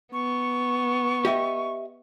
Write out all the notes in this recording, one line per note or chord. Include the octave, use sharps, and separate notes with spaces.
B3 C#6
G4 D#5 E5